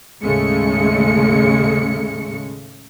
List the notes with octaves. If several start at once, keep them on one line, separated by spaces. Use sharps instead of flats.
D#2 A2 C#3 G#3 A3 C#7